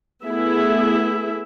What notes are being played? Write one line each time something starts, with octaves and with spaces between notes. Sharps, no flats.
A3 B3 E4 G#4 E5